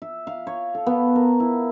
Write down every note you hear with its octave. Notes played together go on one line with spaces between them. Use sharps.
E5
F5
C#5
A4
B3
A#4
E4